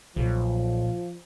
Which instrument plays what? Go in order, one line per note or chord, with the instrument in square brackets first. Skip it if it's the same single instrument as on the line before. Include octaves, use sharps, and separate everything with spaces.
[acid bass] B1 [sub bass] A#2 [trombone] F3